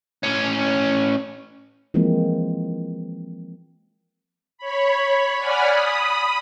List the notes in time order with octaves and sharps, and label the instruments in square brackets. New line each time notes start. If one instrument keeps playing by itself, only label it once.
[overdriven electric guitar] A2 C#4
[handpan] E3 F3 G#3 A#3 C4
[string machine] C#5 B5
D5 F#5 G#5 B5 F6
B5 D#6